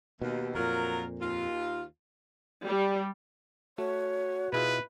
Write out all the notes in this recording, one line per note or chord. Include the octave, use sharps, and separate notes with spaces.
D#2 B2
F2 A#2 F#3 F4 A#4
D#2 F4
G3
A3 F#4 C#5
B2 E4 F4 G#4 B4